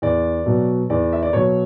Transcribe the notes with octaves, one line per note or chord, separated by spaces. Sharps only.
E2 D5
B2 F#3
E2 D5
E5
D5
B2 F#3 C#5